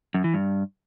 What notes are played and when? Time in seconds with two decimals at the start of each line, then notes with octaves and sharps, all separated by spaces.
0.14 F#2
0.24 E3
0.34 G2